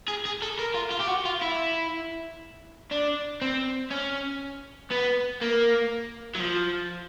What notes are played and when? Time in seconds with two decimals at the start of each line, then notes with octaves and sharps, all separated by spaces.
0.08 G#4
0.25 G#4
0.42 A4
0.59 A#4
0.75 F4
0.92 F4
1.00 G4
1.08 F#4
1.26 F4
1.42 E4
2.91 D4
3.42 C4
3.91 C#4
4.90 B3
5.41 A#3
6.36 F#3
6.40 F3